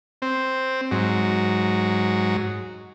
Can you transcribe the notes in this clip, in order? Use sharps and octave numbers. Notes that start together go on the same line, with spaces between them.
C4
G#2 F#3